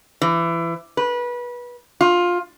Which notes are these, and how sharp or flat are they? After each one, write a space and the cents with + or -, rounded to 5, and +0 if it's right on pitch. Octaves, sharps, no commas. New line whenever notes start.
E3 +25
B4 -25
F4 +15